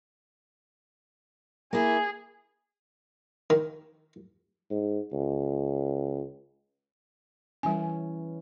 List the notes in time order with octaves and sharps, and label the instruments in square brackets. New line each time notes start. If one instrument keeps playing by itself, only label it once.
[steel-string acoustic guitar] A#3 E4 [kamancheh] G#4
[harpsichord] D#3
[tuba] G#2
C#2
[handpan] E3 C#4 [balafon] G3 G#5